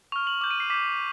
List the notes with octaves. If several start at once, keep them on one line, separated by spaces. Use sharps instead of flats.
C#6 F6 F7
F#7
D6 G6 F#7
D#7
C7
D6 G6 B6